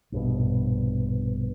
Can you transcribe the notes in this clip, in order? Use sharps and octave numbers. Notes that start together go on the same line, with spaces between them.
A#1 G2 B2